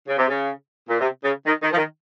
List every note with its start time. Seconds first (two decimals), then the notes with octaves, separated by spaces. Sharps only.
0.08 C#3
0.19 C3
0.29 C#3
0.89 A#2
1.00 C3
1.24 C#3
1.47 D#3
1.63 D#3
1.73 F3
1.77 D#3